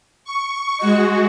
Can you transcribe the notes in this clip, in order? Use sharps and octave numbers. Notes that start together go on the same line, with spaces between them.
C#6
G#3 F#4 D#5